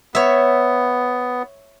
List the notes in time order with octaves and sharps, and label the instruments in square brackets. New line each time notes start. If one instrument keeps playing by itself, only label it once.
[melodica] B3 [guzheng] C#5 E5